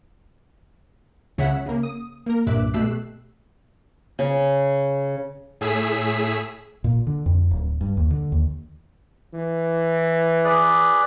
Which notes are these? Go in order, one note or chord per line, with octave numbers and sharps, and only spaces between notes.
C#2 C#3 C#5 E5 F#5 B6
C#3 A#3
D#6
A#3 A#4
C2 G2 A#2 E5 D6 F#6
B2 A3 G4 E6 F#6 C7
C#3
A2 G#4 E6 B6
A#2
D3
F2
D1
G2
D#2
D3
D#2
E3
G#4 B4 D5